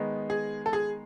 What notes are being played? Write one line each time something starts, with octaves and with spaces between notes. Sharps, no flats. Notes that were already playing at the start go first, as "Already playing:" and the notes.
Already playing: D#3 G#3 B3 D#4
G#4
A4
G#4